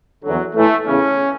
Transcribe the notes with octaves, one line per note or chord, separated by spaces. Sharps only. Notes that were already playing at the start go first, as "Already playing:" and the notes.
E2 D3 F#3
A2 E3 A3
E2 C#3 E3 C#4